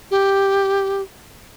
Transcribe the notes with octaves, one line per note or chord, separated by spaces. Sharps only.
G4